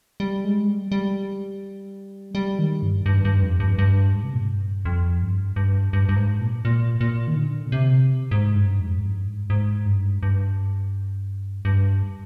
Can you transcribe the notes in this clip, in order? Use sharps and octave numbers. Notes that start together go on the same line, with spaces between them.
G3
G#3
G3
G3
G3
D#3
G2
G2
G2
F2
G2
G2
G#2
C3
A#2
G#2
G2
F2
G2
G2
G2
G2
G#2
A#2
A#2
A#2
D#3
D3
A#2
C3
G#2
G2
F2
G#2
G2
G#2
G#2
G2
G2
G2